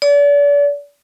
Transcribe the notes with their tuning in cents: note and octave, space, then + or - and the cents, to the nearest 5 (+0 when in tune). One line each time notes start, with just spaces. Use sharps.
D5 -40